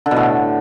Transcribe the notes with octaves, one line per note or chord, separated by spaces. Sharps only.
D3
B2
A2